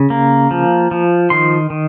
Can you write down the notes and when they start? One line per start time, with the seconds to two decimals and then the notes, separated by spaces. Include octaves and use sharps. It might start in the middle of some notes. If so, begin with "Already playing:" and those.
Already playing: C#3
0.10 A#3
0.51 F3
0.91 F3
1.30 D#3 C6
1.70 D#3